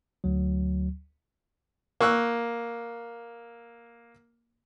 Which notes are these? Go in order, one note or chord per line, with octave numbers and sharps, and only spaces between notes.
D2 F#3
A#3 C#6 E6 F#6